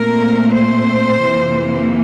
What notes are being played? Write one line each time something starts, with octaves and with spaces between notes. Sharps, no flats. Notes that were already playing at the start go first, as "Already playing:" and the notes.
Already playing: A#2 A3 C4 A#4
C5
F2 C3 E3 A#3